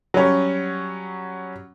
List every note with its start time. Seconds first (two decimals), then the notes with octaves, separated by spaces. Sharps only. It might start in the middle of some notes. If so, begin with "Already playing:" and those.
0.14 F#3 G3 C#4